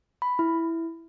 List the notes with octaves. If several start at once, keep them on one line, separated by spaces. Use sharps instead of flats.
B5
E4